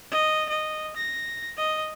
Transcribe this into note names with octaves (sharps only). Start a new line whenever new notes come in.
D#5
D#5
A#6
D#5